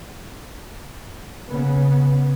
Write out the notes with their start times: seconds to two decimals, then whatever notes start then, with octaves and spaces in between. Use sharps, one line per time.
1.48 C#3 B3